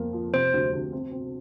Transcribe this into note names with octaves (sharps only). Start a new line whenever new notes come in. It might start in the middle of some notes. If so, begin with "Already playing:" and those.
Already playing: F2 A#3
F3
C3 C5
D2
D2
C4
C4